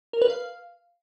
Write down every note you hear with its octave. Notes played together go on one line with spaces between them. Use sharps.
A#4
B4
F5